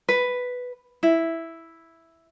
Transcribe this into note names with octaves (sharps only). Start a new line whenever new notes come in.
B4
E4